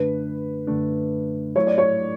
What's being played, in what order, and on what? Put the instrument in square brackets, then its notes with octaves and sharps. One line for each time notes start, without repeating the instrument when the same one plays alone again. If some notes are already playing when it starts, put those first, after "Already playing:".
Already playing: [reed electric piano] F#2 D3 A3 D4 [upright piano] B4
[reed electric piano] F#2 D3 A3 D4
[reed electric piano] F#3 A3 E4 [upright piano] C#5
[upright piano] D5
C#5